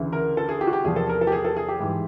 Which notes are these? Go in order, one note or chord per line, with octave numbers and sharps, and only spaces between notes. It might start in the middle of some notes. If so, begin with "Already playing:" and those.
Already playing: D2 C#3 E3
A#4
A4
G#4
G4
F#4
G4
E2 C3 F3 G#4
A4
A#4
A4
G4
G#4
A4
G#4
G4
G#2 E3